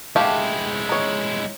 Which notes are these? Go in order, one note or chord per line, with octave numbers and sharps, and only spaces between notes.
G#3 A3 E4 G4 F5
D#4 C#5